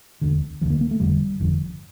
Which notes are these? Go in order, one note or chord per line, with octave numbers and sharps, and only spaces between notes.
E1 D2 D3
E1 D2 D3 E3
A#3
A#3
A3
G1 F2 D3 G3
G1 F2 D3